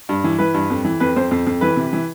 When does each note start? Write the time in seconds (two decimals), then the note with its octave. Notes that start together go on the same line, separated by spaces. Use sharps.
0.09 G2
0.24 E3
0.39 E3 B4
0.54 G2
0.70 F2
0.85 E3
1.00 F2 B4
1.16 F2 C5
1.31 F2
1.47 F2
1.61 E3 B4
1.77 C3
1.93 E3